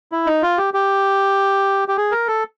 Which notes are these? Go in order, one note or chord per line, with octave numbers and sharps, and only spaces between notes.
E4
D#4
F4
G4
G4
G4
G#4
A#4
A4